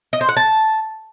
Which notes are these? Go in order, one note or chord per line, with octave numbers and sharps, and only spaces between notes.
D#5
C5
F#5
A5